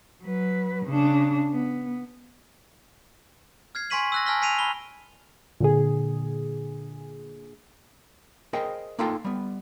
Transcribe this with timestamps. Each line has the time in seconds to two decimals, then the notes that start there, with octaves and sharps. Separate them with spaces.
0.23 F#3 B4
0.86 C#3 D4
1.53 B3
3.75 F6 G#6 C7
3.90 G#5 C6 C#6 B6 D#7 F#7
4.12 E6 F#6 A#6
4.26 G#5 A5 F6 F#6 B6 G7
4.42 G#5 B6 C7 D#7 F7
4.59 B5 G7
5.60 A#2 D3 G#4
8.53 G#4 A#4 C5 D#5 F5 G5
8.99 A#3 D#4 F4 A4 F5 G5
9.24 G3 B3